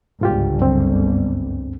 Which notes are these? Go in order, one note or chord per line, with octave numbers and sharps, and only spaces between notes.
G1 C#2 G#2 F4 G4
F#2 C4